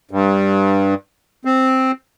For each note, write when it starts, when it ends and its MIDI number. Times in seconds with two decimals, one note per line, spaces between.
0.11 0.94 43
1.45 1.91 60